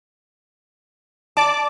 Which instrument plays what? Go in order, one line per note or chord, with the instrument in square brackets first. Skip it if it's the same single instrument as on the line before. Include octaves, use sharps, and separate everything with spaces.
[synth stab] D5 D6 [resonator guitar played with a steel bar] A5